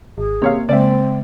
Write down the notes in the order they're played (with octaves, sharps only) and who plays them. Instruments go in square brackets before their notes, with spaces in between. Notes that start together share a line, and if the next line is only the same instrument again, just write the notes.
[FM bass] G#1 [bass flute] G#4
[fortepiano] C3 C#5 F5 [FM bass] A#3
[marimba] C#3 G#3 [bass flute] C4 [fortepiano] D5 E5